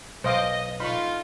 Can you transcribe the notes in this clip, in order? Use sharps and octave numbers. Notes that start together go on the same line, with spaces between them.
B1 C5 D#5 F5 D6
A3 D#4 F4 B5 C#6